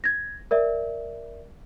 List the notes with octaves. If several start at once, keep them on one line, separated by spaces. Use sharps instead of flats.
G#6 A#6
A#4 D5 E5